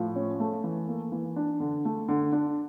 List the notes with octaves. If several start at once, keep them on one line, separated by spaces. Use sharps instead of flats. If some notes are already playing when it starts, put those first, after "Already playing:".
Already playing: A2 F3
C#4
A3
E3
A#3
E3
D4
D3
A3
D3
D4